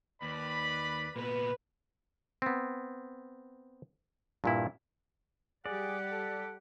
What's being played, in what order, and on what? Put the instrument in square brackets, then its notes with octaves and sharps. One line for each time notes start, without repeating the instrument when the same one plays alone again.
[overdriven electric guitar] D#2 [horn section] B4 D5 B5
[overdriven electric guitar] A#2 B3 [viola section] B4
[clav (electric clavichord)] B3 C4
G2 A#2 E4
[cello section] G3 G4 [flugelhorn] G#4 [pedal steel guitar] D5 [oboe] F#5
[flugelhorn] A4